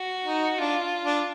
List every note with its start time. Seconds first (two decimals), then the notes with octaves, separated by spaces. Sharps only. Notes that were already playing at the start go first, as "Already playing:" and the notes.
Already playing: F#4
0.25 D#4
0.58 D4 F4
1.04 D4